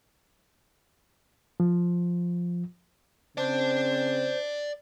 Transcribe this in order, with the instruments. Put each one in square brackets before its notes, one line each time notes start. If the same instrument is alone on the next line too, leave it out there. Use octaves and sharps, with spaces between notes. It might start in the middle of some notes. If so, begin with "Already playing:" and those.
[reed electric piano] F3
[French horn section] C#3 C4 [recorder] C5 [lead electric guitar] D5 A5